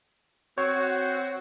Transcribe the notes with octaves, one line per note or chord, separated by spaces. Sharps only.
C4 F#4 C#5